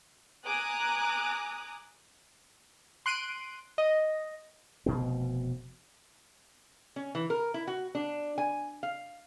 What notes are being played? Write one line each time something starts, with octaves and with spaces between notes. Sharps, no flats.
G#5 A#5 D6 D#6 F#6
C6 F#6 D7 D#7
D#5
F1 B2 C4
C#4
E3
A#4
E4
F#4
D4
G#5
F5